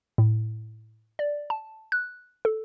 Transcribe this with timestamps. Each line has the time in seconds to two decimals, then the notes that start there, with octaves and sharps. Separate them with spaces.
0.18 A2
1.19 D5
1.50 A5
1.92 F#6
2.45 A4